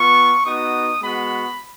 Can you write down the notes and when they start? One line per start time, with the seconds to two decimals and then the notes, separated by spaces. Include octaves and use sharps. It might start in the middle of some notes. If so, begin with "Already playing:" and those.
Already playing: B3 F4 C#6
0.45 B3 D#4 F#4 D#6
1.00 G#3 B3 F#4 B5